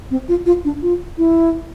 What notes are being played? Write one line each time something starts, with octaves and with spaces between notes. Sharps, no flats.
C4
F4
F4
D4
F4
E4